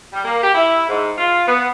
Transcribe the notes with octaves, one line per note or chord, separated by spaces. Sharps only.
G3
A#3
G4
E4
G#2
F4
B3